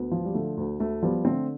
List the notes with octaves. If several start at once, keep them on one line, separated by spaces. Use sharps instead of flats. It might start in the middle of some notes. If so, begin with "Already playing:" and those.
Already playing: D2 B3
F3
G3
D3 A3
D2
D2 A3
F3 G3 B3
D3 A3 C4